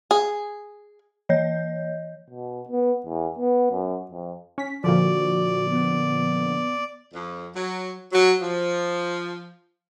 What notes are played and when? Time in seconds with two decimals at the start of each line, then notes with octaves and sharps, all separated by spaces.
0.11 G#4
1.29 E3 C#5 D#5 G6
2.30 B2
2.69 B3
3.05 E2
3.39 B3
3.72 F#2
4.11 F2
4.58 C#4 B6
4.84 A#2 D3 F3 F#4 D5
5.69 B3
7.12 F2
7.54 F#3
8.11 F#3
8.40 F3